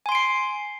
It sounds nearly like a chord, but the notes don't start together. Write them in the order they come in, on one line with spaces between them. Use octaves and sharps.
G#5 C6 D7 C7